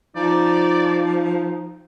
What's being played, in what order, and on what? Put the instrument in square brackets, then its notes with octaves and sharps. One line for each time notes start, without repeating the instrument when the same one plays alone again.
[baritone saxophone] F3 [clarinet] D#4 [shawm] D5